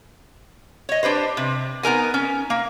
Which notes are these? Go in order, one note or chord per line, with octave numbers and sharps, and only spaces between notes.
C#5 D#5
D4 G4 B4 C5
C3
B3 D#4 A#4 G#5
C#4
A#3